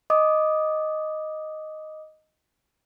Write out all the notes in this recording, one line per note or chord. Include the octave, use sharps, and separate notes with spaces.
D#5 D6 D#6